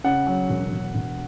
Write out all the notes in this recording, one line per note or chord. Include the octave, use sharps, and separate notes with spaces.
C#3 F#5
F#3
E1
E1
E1